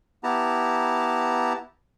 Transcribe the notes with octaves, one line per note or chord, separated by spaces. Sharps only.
B3 E4 G4 A5 A#5